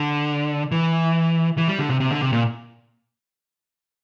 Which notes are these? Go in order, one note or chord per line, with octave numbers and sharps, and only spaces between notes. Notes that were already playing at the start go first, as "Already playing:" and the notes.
Already playing: D3
E3
E3
G3
D3
C3
C3
D3
C3
A#2